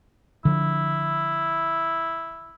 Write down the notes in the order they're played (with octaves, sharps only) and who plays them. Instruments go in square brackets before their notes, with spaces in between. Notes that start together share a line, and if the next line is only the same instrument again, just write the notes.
[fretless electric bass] D3 F3 [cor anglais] E4